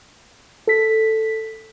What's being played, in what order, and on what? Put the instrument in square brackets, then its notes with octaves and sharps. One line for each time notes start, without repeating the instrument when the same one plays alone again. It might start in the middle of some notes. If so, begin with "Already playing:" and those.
[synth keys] A4 B6